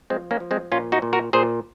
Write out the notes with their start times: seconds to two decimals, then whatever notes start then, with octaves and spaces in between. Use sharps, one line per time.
0.10 F3 G#3 C4
0.31 A#3 C#4
0.40 F3
0.51 G#3 C4
0.72 A#2 C#4 F4
0.92 D#4 F#4
1.02 A#2
1.13 F#4 A#4
1.33 A#2 G#4 C5